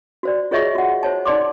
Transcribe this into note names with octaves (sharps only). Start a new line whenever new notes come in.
F#4 C5 D5
F4 G#4 C#5 D#5 E5 C#6
F#4 F#5
C5 C#5 A5
D#4 D5 C6 D6